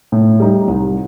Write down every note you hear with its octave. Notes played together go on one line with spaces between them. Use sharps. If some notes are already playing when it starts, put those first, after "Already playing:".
A2
G3 D#4 G4
C2